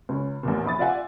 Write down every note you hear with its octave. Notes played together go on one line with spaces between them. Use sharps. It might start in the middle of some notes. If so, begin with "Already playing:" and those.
C#2 C#4
A1 E2 A#2
A#1 B5 D#6 A6
F4 D5 E5 F#5 G#5